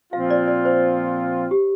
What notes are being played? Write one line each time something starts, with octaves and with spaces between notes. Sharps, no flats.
A#2 F3 C4 F4 F5
D5
D5
C5
G4